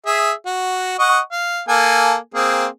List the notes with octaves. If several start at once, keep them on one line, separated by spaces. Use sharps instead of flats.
G#4 E5
F#4
D#5 F#5 C#6
F5
A#3 A4 G#5
A#3 C4 G#4